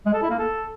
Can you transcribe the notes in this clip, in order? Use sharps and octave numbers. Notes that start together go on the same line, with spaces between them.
G#3
A4
E4
A#3
A4